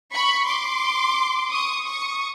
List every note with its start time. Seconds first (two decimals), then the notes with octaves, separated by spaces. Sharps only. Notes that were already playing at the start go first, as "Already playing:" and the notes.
0.13 B5 C#6
0.47 C6 D6
1.51 C#6 D#6
1.85 C#6 D#6